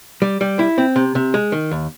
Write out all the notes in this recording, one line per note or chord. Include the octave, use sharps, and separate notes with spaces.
G3
G3
E4
C4
C3
C3
G#3
D#3
D#2